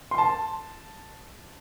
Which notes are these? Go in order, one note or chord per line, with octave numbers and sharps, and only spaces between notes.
C6
A5